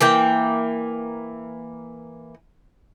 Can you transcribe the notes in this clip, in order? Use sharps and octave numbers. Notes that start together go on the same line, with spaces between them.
E3 A#3 G5